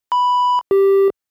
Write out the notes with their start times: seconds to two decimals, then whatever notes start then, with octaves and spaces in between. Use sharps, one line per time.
0.12 B5
0.71 G4